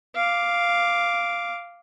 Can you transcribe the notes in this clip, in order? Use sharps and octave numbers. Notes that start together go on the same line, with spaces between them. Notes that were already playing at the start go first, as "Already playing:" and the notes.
F5 D6